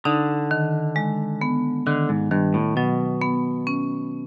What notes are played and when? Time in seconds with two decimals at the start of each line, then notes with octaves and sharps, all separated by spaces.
0.05 D3 D#4
0.51 D#3
0.96 G#3
1.41 B3
1.86 D3 D#3
2.09 G#2
2.31 G2 D#3
2.54 A2
2.77 B2 F#3
3.22 B3
3.67 C#4